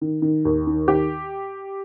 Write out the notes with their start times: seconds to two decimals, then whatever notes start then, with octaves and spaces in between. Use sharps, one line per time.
0.01 D#3
0.22 D#3
0.45 D#2
0.67 D#3
0.88 D#3 G4